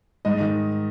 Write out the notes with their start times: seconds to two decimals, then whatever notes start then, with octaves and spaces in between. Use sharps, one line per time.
0.25 G#2 D#5
0.41 D#3